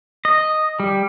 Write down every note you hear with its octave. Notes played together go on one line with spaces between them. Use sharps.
D#5
G3